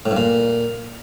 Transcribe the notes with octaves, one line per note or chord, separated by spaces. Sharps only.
A2
G2
A#2